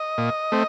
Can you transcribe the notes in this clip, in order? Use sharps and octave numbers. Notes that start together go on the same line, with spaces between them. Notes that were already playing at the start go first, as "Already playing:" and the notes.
Already playing: D#5
A#2
A3 C4